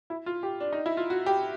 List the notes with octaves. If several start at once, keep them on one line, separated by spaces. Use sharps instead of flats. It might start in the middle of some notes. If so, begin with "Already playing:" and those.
E4
F4
G4
D4
D#4
E4
F4
F#4
G4